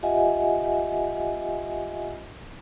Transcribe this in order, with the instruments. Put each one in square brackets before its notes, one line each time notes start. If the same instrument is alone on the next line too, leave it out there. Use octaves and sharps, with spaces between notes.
[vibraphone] F4 G4 D#5 E5 F#5 G#5